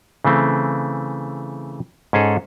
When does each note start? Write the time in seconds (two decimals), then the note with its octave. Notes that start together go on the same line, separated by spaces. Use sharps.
0.25 C#3 E3 A3 C4
2.13 G#2 C#4 G#4 A4